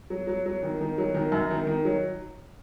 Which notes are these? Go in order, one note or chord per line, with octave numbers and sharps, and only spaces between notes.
F#3
F#3
F#3
D#3
D#3
F#3
D#3
F#2
D#3
D#3
F#3